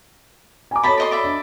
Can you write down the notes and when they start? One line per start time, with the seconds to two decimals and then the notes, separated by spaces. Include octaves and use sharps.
0.71 G#5 A#5 D6
0.83 F#4 A4 C#5 D#5 A5 B5
0.98 D5 D#5 C6
1.11 D5 E5 B5
1.24 D4